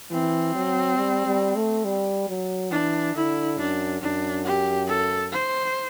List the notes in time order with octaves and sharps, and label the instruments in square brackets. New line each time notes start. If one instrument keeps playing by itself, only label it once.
[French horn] E3 [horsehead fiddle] C4
[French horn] F#3
G3
G3
A3
G3
F#3
[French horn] E3 [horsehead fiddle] D4
[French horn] D3 [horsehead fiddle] E4
[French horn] F#2 [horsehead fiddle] D4
[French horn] F#2 [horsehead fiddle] D4
[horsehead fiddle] G4
A4
C5